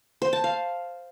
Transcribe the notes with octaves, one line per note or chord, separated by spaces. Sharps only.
C5
A5
F5